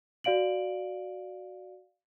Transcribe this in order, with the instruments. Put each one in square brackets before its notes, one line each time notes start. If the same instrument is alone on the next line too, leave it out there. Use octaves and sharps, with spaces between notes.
[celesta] F#4 D5 F5 D7 F#7